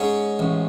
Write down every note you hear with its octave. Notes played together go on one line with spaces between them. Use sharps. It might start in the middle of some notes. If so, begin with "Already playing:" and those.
Already playing: G#2 C#4
A1